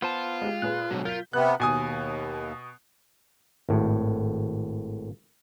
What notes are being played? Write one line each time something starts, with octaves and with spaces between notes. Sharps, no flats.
B3 F4 C5 A5
G#3 G4
A#2 G#4 B4 F#6
G#2 B2 D3 F#3
F4 A#4 G6 B6
C3 B3 F#6
D#2 B2 G#5 D#6
G#1 A2